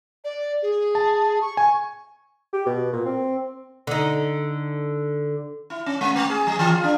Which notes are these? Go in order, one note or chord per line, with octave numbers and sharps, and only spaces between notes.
D5
G#4
A5
C#6
G#5 C#6
G4
B2
A#2
C4
D3 D#4
E4
C#4
G#3
A3
G#4
F#3
E3
F4
D4